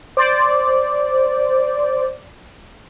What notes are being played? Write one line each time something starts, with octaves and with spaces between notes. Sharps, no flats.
C5 D5